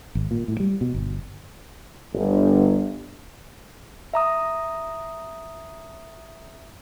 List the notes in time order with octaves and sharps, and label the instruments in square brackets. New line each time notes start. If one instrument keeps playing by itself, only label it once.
[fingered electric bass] G#1
A#2
A2
G3
B2
G1
[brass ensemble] G1
[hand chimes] E5 A#5 D#6